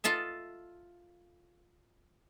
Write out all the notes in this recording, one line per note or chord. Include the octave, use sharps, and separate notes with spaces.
F4 A4 D#5 E5